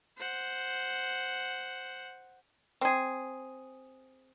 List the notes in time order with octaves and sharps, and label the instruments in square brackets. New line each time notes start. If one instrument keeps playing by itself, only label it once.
[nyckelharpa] C5 F#5
[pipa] C4 G#4